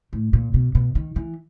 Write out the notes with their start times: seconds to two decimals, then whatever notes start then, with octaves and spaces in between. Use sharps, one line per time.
0.13 A2
0.33 A#2
0.54 B2
0.75 B2
0.95 D#3
1.16 E3